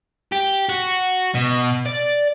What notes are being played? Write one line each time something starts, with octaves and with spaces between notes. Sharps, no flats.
G4
F#4
B2
D5